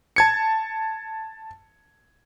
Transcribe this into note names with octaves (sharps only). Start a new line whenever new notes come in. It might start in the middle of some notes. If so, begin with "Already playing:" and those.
A5 G#6 C#7